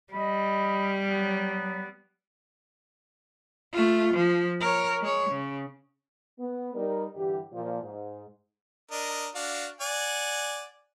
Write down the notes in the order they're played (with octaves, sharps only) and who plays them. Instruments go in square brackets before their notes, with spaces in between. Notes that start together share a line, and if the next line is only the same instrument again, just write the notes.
[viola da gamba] G3 [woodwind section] D#5 B5
[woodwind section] F#3 B3
[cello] A3 F4
F3
A#4 C#5
G#3 C#5
C#3
[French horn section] B3
G3 D#4 A#4
G2 D3 E3 G4
A#2 F3
G#2
[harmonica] D4 A#4 D#5
D4 F#4 F5
D5 F#5 G#5